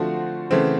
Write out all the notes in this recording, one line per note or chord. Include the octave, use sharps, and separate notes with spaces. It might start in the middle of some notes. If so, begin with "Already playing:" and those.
Already playing: D3 F3 A3 C4 F#4
C#3 E3 A3 C4